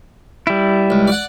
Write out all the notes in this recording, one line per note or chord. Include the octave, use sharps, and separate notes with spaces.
G3 E4
C#2
D5 F#5